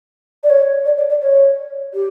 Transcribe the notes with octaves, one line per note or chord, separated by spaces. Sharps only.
D5
C#5
D5
D5
D5
C#5
G4